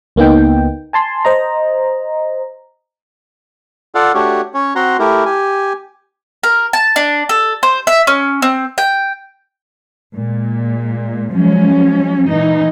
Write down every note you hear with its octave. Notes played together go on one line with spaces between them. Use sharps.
C#2 A#3 B3 D#4 G5
G#5 A5 C6
C5 D#5 A#5
F4 A4 D5 F5 F#5
A3 D4 F#4 G4 C#5
C#4 C#5
C4 F#4 F#5 A#5 C6
A3 E4 G4 A#4
G4 G#5
A#4
A5
D4
A4
C5
E5
C#4
C4
G5
A#2 G#3
F3 F#3 G#3 C#4
A#2 E3 D#4